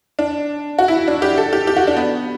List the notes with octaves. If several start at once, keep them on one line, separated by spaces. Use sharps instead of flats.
D4
F#4
E4
D4
G4
A4
G4
G4
F#4
D4
B3